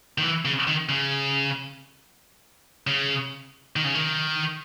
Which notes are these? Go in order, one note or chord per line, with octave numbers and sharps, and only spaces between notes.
D#3
E3
C#3
D#3
C#3
C#3
D#3
C#3
D#3